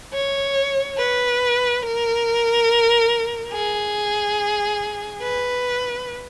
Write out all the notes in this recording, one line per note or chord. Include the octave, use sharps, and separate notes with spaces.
C#5
B4
A#4
G#4
B4